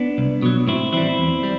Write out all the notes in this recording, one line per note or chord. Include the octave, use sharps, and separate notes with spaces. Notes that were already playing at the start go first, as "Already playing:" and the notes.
Already playing: B3 D4
C2
B2 F#3
A2 C4 E4
E3 G3 C4 E4
E2
G3